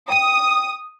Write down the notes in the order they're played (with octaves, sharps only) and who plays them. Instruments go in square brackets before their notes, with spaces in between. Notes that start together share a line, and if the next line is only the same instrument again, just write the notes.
[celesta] G5 D#7 [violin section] D#6